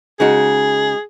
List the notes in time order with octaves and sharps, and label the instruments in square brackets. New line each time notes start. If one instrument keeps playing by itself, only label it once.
[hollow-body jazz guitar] C#3 G#3 D#4 F#4 [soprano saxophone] G#4